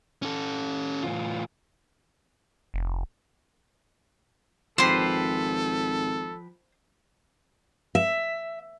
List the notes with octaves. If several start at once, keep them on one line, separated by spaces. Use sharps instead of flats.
C#4 A4
A2 E3 F4
F1
G#1 F3 G4 A4 B4 C5 C6
E5